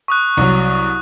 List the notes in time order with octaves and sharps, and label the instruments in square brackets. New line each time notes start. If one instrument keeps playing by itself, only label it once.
[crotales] C#6 D#6 F#6
[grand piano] C2 F#3